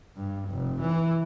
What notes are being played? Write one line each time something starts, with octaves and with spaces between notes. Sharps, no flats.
G2
F1
E3